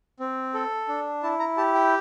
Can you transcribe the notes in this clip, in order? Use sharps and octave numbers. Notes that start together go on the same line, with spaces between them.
C4
A4
D4
E4 A5
A#5
G4 A5
G5